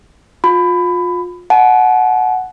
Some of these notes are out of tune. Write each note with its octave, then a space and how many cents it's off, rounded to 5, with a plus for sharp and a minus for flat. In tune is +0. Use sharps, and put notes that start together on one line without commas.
F4 +30 B5 +20
F#5 +0 A5 -45